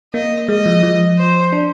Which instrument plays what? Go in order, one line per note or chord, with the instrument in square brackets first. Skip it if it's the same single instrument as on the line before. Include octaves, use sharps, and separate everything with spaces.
[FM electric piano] A#3 [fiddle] D#5
[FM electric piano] G#3 [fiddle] D#5
[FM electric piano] F3
F3
[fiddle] C5
[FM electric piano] D4